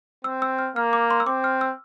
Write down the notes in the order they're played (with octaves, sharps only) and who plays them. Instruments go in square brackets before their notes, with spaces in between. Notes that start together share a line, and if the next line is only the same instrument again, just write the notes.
[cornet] C4 [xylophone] E6
[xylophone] E6
F6
[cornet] A#3 [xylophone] F6
[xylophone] D6
C6
E6
[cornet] C4 [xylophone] D6
[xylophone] F6
E6